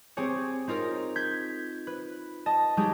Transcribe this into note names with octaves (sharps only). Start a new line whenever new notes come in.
C4 G4 G#4 C#5
C4 D#4 F4 A#4
G6 G#6 B6
B4
D#5 A5
F#3 G#3 D#4 G4 G#4